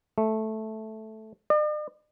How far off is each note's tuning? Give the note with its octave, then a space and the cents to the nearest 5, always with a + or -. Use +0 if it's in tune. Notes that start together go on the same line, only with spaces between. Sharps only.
A3 -5
D5 +45